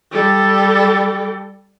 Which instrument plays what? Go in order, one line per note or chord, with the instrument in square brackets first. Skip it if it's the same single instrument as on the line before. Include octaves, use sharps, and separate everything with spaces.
[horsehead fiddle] G3 A4